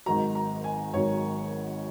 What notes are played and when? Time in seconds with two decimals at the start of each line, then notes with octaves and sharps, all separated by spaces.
0.06 G#1 G#2 D#3 F#3 A#5
0.35 A#5
0.64 G#5
0.93 G#1 G#2 D#3 F#3 C#5